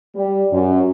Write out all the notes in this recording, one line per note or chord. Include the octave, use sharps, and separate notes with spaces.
G3
F#2